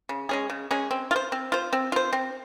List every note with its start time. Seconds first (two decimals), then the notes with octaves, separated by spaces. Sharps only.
0.09 C#3
0.29 G#3 C#4 G#4
0.50 C#3
0.71 G#3 C#4 G#4
0.91 C4
1.11 F4
1.16 C5
1.32 C4
1.52 F4 C5
1.73 C4
1.92 F4 C5
2.13 C4